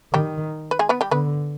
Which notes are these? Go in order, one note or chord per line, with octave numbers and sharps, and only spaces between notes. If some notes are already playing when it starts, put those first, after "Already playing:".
D#3 G3 G4
B4
G#3 G#4
B3 B4
G3 G4
D3 B3 B4